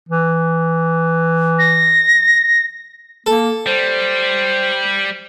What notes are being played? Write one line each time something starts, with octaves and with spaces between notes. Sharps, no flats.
E3
A#6
A#3 A4
G3 C5